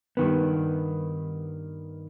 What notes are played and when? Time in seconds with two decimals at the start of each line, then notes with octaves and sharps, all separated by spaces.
0.17 G2 D#3 B3